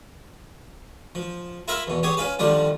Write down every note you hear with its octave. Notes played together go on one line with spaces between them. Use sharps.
F3
E4 F4 A#4 E5 B5
E2 B2
B3 G4 G#4 C#5
C#4 F4 B4
D3 D#3 F3 G3 F4